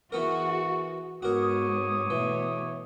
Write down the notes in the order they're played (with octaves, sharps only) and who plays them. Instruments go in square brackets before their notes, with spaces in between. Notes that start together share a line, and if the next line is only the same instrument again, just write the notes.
[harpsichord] E3 B3 A#4 [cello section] F#4 G#4 [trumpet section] C#6
[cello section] G#2 B3 [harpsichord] F#4 A#4 [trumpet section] C#5 D6 D#6
[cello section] B2 A3 B3 [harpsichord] E3